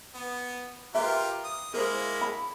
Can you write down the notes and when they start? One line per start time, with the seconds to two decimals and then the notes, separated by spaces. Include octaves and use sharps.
0.15 B3
0.94 F4 G4 A#4 B4 E5
1.44 D#6
1.74 G#3 A#3 E4 A#4 C5
2.21 B5